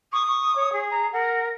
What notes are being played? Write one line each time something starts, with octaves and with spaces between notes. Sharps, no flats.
C#6 D#6
C#6
C#5
G#4
A#5
A#4 F#5